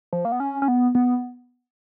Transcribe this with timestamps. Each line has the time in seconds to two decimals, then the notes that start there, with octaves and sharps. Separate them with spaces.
0.13 F3
0.25 A#3
0.32 B3
0.40 C#4
0.62 C#4
0.68 B3
0.95 B3